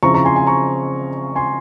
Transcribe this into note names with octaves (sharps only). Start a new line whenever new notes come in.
C#3 F3 C4 E4 A#5 C#6
A#5 C#6
G#5 C6
G#5 C6
A#5 C#6
G#5 C6